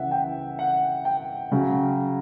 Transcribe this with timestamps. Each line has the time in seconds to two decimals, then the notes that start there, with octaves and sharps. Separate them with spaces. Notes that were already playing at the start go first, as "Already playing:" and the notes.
Already playing: C#3 E3 E5 F#5
0.11 G5
0.59 F#5
1.05 G5
1.52 C#3 F#3